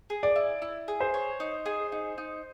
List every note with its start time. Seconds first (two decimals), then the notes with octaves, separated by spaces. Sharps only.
0.10 G#4
0.23 D5
0.36 E4
0.62 E4
0.88 G#4
1.00 C5
1.14 C#5
1.40 D#4
1.66 G#4
1.92 D#4
2.18 D#4